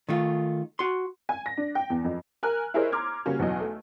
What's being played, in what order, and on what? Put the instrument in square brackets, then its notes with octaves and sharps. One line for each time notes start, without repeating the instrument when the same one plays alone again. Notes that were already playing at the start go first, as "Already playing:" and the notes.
[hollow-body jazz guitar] D#3 A3 F4
F#4 C6
[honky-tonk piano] G#5
A#6
D4
G5
E2
F2
A#4 G#5 A#5 F6 F#6
E4 G#4 A#4 C5 C#5 D#5
A#5 C6 D6 F6 G#6
C#3 G3 A#3 C#4 F#4
B1 E2 E3 F#3 D#5
A3